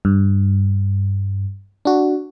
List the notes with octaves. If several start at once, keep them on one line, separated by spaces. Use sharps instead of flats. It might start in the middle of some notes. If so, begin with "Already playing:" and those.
G2
D4 F#4